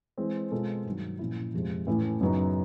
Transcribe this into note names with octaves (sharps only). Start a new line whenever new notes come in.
E3 G#3 C4
B2 G#3 C4 F4 A4
G2 D#3 F#3
A#2 F3 A#3 C#4 E4
F2 C3 F3 G#3
A2 E3 A3 C#4 E4
F#2 C#3 F#3 B3 D#4